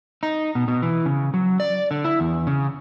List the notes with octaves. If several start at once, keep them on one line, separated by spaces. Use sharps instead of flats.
D#4
B2
B2
E3
C#3
F#3
D5
D3
E4
E2
C#3